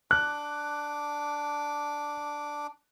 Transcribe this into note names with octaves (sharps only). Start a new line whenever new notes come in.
D4 D6 F#6